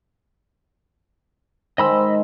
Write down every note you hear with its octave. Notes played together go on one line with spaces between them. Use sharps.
D#3 G#3 C5 D#5 B5 E6